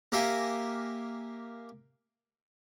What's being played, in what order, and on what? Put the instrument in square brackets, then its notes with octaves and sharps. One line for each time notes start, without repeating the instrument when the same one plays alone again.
[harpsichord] A#3 G4 A#4 E5 F5 G#5